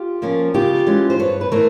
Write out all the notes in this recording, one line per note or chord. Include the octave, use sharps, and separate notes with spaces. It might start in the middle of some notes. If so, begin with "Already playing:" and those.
Already playing: F4 G4
F3 A#3 C#4
C#3 F4 G4
E3 G#3 C#4
C5
G2 B4 C#5
B4
E3 A3 A#4 C5